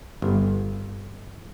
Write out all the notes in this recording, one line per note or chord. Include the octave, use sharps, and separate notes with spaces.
G1